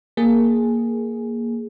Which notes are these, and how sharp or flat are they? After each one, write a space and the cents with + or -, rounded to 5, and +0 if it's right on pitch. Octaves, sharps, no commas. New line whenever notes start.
A#3 +0 G#4 +0